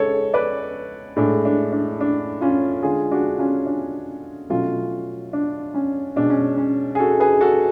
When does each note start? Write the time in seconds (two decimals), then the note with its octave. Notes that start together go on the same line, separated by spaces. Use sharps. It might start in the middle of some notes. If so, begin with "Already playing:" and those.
Already playing: C#3 G#3 A4 C#5
0.34 B4 D5
1.16 A2 G#3 D4
1.45 D4
1.73 D4
2.01 D4
2.41 C#4 F4
2.83 D3 G#3 F4 G#4
3.12 D4 F#4
3.38 C#4 F4
3.66 D4
4.50 B2 F#3 A3 C#4 F4
5.33 D4
5.74 C#4
6.16 B2 G#3 D4
6.30 C#4
6.58 C#4
6.95 G#4
6.99 F#4 A4
7.20 G#4 B4
7.41 F#4 A4